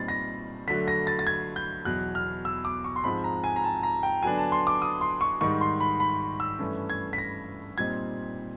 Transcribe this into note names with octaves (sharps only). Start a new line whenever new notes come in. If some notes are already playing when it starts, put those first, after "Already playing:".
Already playing: A#2 G3 C4 D#4 A6
A#6
D3 F#3 A3 B6
A#6
A6
A6
G#6
G6
E2 B2 F#3 F#6
F6
E6
D6
C#6
C6
G#2 F3 G#3 C4 B5
A#5
G#5
A#5
A5
A#5
G5
D3 F#3 B3 D4 G#5
A5
C6
D6
D#6
C6
C#6
G#2 D#3 G3 C#6
C6
B5
B5
E6
G2 E3 A3 C#4
G#6
B6
A#6
A#2 G3 C4 D#4 G#6